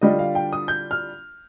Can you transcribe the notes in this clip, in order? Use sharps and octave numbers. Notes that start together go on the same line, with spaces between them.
D3 G3 D4 F4 D#5
F5
G5
D#6
G6
F6